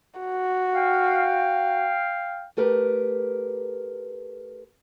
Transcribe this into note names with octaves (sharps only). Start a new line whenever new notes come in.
F#4
F5 G5
A3 G4 A#4 B4